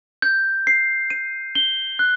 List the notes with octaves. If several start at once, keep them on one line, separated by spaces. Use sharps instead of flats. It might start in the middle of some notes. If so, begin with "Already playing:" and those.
G6
C7
D#7
G7
F#6